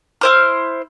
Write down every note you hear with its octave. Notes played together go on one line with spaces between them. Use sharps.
E4 C5 F6